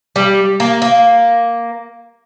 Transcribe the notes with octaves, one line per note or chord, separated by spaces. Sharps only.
G3
A#3
A#3